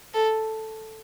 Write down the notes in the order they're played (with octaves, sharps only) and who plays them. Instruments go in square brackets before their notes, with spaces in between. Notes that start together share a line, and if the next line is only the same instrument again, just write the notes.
[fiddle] A4